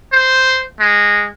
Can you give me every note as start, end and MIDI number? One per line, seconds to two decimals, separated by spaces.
0.12 0.63 72
0.80 1.27 56